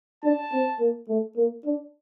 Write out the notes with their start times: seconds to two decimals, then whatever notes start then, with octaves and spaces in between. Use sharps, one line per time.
0.24 D4 A5
0.52 C4
0.80 A#3
1.09 A3
1.37 A#3
1.65 D4